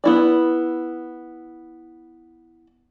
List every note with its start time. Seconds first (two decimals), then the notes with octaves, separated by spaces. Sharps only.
0.04 B3 E4 D5